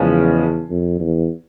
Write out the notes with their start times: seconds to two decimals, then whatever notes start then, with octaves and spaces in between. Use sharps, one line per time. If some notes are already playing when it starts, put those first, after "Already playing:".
Already playing: E2 C#3 F3 G#3 C#4
0.69 F2
1.00 E2